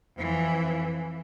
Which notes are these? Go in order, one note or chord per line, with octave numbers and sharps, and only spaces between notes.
F2 E3